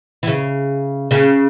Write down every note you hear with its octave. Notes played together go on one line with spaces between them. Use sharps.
E3
C#3
C#3